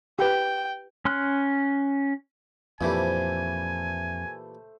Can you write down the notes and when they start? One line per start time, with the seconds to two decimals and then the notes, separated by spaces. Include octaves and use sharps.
0.19 G4 B4 G5
1.05 C#4 C6 F6 F#6
2.81 F2 A#2 E3 G3 A3 C5 E5 G#5